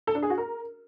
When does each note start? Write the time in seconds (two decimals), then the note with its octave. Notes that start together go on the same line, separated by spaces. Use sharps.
0.07 A4
0.15 D4
0.23 G#4
0.30 F#4
0.38 A#4